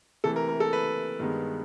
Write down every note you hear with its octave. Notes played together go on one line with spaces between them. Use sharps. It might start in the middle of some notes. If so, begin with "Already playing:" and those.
C3 E3 A3 A4
A#4
A#4
A4
B4
G2 D#3 G#3 B3